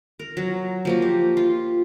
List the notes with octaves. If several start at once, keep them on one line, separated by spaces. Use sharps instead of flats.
A#4
F#3
F3 A#3 F#4
G4
F4